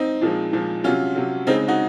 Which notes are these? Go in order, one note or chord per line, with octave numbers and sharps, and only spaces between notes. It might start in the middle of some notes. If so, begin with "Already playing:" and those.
Already playing: C4 D#4
A#2 F3 G#3
A#2 F3 G#3
C3 F#3 C#4 F4
C3 F#3
C#3 G#3 C4 D#4
D#4 F#4